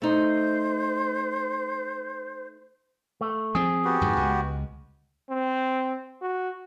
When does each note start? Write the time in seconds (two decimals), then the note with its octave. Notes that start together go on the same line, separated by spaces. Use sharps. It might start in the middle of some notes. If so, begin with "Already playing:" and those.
0.02 A3 D#4 C5
3.21 A3
3.55 F3 C4 G#4
3.85 B3 F#4 G4
4.01 F2 G#2 D3
4.16 C#2 G#3
5.30 C4
6.22 F#4